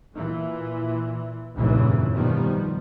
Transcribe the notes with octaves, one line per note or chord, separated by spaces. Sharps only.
A#2 E3
F1 A#1 G2 A#2 C#3 E3
B2 D#3 F3 G3 B3